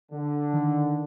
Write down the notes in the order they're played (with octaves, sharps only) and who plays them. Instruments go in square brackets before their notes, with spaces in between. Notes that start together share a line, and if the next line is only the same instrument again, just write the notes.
[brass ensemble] D3
[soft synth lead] D#3